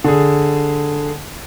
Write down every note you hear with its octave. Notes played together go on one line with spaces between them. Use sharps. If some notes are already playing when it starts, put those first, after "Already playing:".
D3 G#4